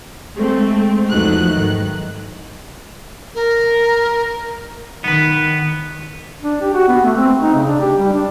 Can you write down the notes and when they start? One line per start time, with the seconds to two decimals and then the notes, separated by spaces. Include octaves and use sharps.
0.37 G#3 A3 C4
1.10 E2 F3 F#3 A3 D#4 F#6
1.52 G#2 D#3
3.35 A#4
5.04 D#3 B3 B4
6.42 D4
6.61 G4
6.74 F#4
6.88 B3
7.04 A3
7.17 C4
7.42 D#4
7.55 C#3
7.68 D4
7.81 G4
7.98 G3
8.13 D4